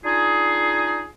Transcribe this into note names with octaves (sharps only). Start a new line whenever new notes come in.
D4 D#4 F4 G#4